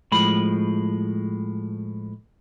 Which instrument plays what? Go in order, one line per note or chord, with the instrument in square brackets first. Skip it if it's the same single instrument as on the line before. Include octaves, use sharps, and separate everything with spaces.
[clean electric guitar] A2 F3 G#3 B5